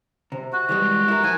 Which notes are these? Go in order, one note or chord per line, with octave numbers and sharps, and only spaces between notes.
C3
F#4
E3 G3 G#3
E4 A#4
F3 G#5